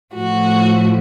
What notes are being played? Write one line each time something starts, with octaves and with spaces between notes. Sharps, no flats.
A2 F3 A3 F#4